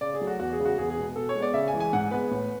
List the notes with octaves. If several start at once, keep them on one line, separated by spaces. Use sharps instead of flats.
C#3 D5
G#4
F#3 A3
F#4
E2 F#4
G#4
C#3 G#3
F#4
E2 G#4
G#4
B2 G#3 B3
B2 A4
C#5
G#3
B3 D5
C#3 E5
G#5
E3 G#3
G#5
G#2 F#5
G#3 B3 B4
A2